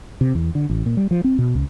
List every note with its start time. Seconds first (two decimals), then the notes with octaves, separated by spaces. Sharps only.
0.21 C3
0.35 E2
0.55 D3
0.70 A1
0.86 A#2
0.97 G3
1.11 F3
1.24 C4
1.39 B2
1.55 C#2